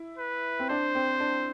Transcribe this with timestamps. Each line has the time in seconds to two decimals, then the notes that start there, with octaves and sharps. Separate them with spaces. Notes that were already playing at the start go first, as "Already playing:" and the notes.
Already playing: E4
0.18 B4
0.59 C4
0.69 D4 C5
0.95 C4
1.20 D4